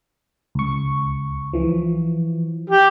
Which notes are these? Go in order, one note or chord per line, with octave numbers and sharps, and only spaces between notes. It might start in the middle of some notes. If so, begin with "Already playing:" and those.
C#2 C#6
E3 F3
G4